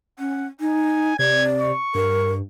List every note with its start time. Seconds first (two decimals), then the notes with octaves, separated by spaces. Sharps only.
0.19 C#4 F#5
0.61 D#4 G#5
1.19 C3 D5 G#6
1.61 C#6
1.95 G2 A#4